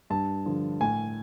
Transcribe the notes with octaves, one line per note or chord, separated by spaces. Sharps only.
G2 A5
D3 F3
A2 G#5